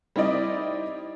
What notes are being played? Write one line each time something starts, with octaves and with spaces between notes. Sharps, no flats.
G3 C4 D#4 E4 D5 D#5